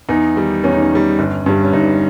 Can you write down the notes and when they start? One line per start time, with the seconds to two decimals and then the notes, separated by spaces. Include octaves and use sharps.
0.09 E2 D#4
0.36 D#3 G3
0.64 E2 C#4
0.73 D#4
0.83 C#4
0.92 D#3 G3
1.19 G1
1.46 G2 G3
1.63 C#4
1.73 G1 D#4